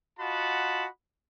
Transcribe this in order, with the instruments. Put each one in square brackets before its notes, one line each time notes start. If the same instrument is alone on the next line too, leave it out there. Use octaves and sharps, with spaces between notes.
[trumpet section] F4 F#4 D#5 F#5 A5 B5